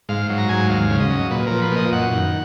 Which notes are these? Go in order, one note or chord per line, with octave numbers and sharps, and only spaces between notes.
G#2 F5
F#3
A#5
G#2 G#5
D#2 F5
C#3
D#5
F#3
A#2 B4
F3 A#4
B4
A#2 D#5
F#2 F#5
D#3